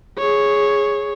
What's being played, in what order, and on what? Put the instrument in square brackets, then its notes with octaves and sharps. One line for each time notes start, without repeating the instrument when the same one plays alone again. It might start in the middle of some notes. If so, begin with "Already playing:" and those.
[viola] G#4 C#5